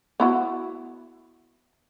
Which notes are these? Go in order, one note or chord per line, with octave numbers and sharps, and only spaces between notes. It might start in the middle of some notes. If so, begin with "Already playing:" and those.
B3 E4 F#4